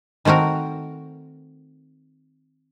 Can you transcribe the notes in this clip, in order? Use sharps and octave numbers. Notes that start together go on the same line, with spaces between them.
D#3 A3 C4 F#4 A#4